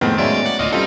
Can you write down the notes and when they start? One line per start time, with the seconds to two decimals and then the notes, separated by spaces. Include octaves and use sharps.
0.01 F2 A2 D#3 G#3 B3 C4
0.18 F#3 G#3 C#4 D5 E5
0.45 F#5 D6 F#6
0.59 D2 F4 F#4 D#5
0.72 G3 C4 C#4 D#4 F4 A4